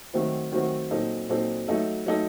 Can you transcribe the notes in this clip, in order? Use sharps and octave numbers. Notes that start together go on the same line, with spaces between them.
D#3 F#3 A3 C4 F#4
D#3 F#3 A3 C4 F#4
A#2 F#3 C4 D#4 A4
A#2 F#3 C4 D#4 A4
F#3 A3 D#4 A4
F#3 A3 D#4 A4